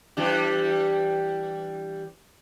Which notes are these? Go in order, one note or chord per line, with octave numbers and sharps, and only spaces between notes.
E3 G3 D4